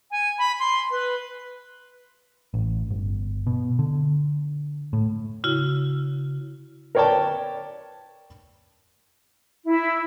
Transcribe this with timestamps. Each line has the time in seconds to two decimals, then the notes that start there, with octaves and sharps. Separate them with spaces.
0.11 G#5
0.39 B5
0.60 C6
0.91 B4
2.54 A1
2.90 G1
3.47 B2
3.79 D3
4.93 A2
5.44 C#3 E4 F#4
6.95 A#4 B4 C#5 D5 G5 A5
9.65 E4